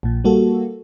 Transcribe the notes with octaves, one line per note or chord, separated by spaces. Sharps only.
A#1 A#2
G3 A#3 F#4 A4